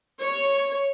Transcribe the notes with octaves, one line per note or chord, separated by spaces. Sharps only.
C#5